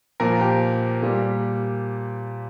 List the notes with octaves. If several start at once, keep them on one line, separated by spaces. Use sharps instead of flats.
A#2 F3 A#4
G4
A#2 G3